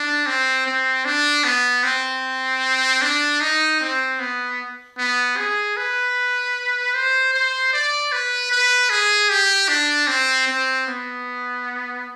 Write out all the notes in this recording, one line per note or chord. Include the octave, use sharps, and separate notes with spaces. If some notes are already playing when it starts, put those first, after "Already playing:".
Already playing: D4
C4
C4
D4
B3
C4
D4
D#4
C4
B3
B3
G#4
B4
C5
C5
D5
B4
B4
G#4
G4
D4
C4
C4
B3